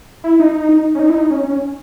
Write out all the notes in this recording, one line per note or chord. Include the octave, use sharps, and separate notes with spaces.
E4
D#4
D#4
D#4
C#4
D#4
E4
D#4
C#4
C#4